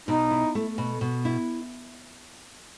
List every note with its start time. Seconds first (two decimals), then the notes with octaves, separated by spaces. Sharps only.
0.07 B2 D#4
0.30 E4
0.55 A3
0.78 B2
1.01 B2
1.25 E4